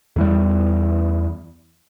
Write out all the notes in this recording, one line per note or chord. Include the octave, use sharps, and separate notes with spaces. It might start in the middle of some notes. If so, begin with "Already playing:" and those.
E2 E3 G3